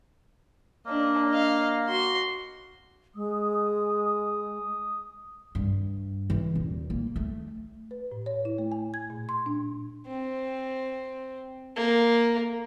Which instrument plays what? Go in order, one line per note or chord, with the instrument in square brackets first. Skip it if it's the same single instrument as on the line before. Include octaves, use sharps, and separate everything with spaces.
[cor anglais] A#3 [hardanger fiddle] D4 D#5
[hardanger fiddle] D#5 F5
F#4 C6
[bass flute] G#3 [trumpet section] D#6
[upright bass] G2
E3
D#1
A#3
A3
[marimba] B4
A2
C#5
E4
A3
G#5
G#6
A#2
C6
D4
[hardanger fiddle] C4
A#3